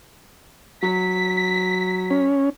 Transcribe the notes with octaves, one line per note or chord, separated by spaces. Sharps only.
F#3 B6
C#4